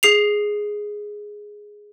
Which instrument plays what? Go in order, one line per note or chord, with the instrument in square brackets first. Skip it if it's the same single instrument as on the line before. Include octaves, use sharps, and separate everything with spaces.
[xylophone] G#4 C7 F7